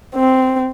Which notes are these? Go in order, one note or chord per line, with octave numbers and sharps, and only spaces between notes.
C4